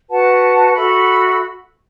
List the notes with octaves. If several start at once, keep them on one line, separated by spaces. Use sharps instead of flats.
F#4 B4 F#5 A5
F#4 A4 E5 B5